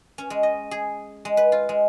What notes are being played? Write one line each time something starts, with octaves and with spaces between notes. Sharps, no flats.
C#4
G#3
D#5
G#4
G#3
B4
F4
G#3